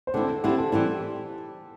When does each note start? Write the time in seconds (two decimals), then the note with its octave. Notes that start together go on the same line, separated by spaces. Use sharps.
0.07 C5
0.14 D3 C4 E4 A4
0.43 D3 C4 E4 G4
0.58 A4
0.72 E3 G3 C4 E4